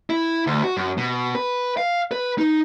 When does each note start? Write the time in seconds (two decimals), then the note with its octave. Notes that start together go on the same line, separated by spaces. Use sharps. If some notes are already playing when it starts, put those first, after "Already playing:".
0.10 E4
0.47 D2
0.64 F#4
0.77 F#2
0.97 B2
1.35 B4
1.77 F5
2.11 B4
2.38 D#4